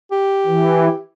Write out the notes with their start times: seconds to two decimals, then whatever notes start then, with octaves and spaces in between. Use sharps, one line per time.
0.12 G4
0.46 E3